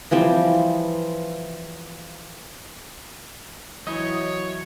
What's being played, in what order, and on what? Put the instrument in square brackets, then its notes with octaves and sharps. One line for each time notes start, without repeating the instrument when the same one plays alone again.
[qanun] E3 F3 G3 C4
[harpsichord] E3 [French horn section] F#3 [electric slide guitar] E4 D#5 [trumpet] C#5